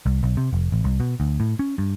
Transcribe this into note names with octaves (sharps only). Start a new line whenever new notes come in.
C2
B1
C3
F1
A1
C2
B2
D2
A2
C#4
G2